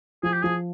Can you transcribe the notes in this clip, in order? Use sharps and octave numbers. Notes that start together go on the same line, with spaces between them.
F3 G#4
G4
F3 G#4